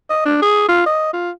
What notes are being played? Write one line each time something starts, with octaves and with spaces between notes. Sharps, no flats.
D#5
D4
G#4
F4
D#5
F4